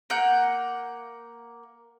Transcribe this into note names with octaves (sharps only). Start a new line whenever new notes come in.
A#3 F#5 G6